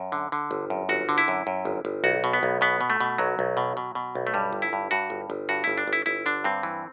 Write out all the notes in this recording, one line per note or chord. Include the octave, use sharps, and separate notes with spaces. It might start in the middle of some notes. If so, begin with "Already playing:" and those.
Already playing: F#2
D3
D3
G1
F#2
G1 F#4
D3
E4
F#2
F#2
G1
G1
B1 F#4
B2
B3
B1
B2 B3
B2
A3
B2
B1 F#3
B1
B2
B2
B2
B1
A3
G2 G3
G1
E4
G2
G2 F#4
G1
G1
G2 F#4
G1 E4
D4
G1
E4
G1 E4
D3 D4
G2 C4
E3